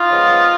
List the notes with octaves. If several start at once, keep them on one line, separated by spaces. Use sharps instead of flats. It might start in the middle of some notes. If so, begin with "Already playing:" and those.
Already playing: D#4 F4
C#3 F3 G#3 B3